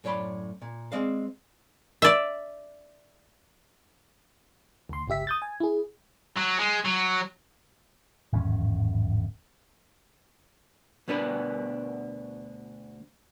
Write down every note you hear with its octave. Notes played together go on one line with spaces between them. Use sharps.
F#2 A2 C#5 D5 B5 C6
A#2
G#3 C4 D5 F5
D5 E5
D2 C6
G1 C#2 G4 E5 B6
D#6 G6 A6
G#5
E4 G#4
F#3
G#3
F#3
D1 G#1 E2 C#4
D2 B2 B3 D4 G#4 B4